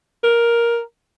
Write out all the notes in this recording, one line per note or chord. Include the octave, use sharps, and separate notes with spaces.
A#4